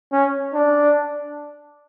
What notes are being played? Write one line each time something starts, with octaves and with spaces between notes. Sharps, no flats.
C#4
D4